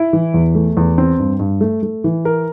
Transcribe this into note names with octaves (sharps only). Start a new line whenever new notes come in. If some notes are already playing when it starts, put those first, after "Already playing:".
Already playing: E4
E3
E2
A3
E2
C4
G2
G2
A3
A3
E3
A#4